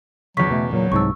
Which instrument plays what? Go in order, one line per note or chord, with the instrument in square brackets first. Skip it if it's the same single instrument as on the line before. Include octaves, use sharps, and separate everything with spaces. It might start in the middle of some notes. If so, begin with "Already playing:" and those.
[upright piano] E2 C#3 [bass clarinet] F#3 [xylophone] C#6 B6
[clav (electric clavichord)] B2 [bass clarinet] A3
[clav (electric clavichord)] A#2 [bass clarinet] F#3
[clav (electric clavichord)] C2 G#2 A5 [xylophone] C#6 E6